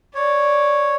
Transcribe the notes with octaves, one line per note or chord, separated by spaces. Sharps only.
C#5 D5